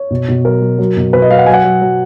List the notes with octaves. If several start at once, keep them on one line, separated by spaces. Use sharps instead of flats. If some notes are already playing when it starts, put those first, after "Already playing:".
Already playing: C#5
B2
B2
F#3 A#4
F#3
F#3
B2
B2 B4
D#5
F#3 F5
F#5
F#3 G#5
F#5
F#3
F#3